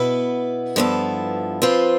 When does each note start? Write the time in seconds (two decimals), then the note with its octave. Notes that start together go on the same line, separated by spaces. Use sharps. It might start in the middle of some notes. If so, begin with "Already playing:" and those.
Already playing: B2 B3 E4 B4
0.76 G2 F3 B3 E4 A4
1.62 F3 C4 F4 B4